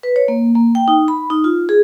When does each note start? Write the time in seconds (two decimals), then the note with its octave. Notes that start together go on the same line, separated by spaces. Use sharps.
0.03 B4
0.16 C#5
0.28 A#3
0.55 A#3
0.75 G5
0.88 D#4
1.08 B5
1.30 D#4
1.44 F4
1.69 G#4